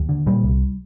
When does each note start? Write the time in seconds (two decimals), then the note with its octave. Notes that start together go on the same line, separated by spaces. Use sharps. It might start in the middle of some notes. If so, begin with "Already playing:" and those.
Already playing: D#2
0.09 D3
0.26 A#2 G3
0.44 C2